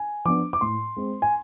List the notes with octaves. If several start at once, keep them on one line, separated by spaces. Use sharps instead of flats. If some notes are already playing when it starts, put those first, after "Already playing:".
Already playing: G#5
F3 B3 D4 D6
D6
A2 C6
G#3 C4
G#5